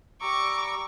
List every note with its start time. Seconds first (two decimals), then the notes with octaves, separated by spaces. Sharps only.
0.22 G3 A#5 C#6 D6 E6